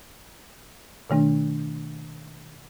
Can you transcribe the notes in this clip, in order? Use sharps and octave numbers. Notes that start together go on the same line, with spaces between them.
B2 D#3 A3 D4